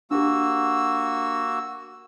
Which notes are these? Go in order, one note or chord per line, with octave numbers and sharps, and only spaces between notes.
A#3 D4 F#4 G4 E6